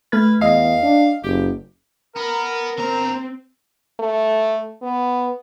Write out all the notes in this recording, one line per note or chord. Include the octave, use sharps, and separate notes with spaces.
A3 B4 F6 G#6
E2 D#5 F5
D4
F#1 G4
B3 A#4
D3 C4 A#5
A3
B3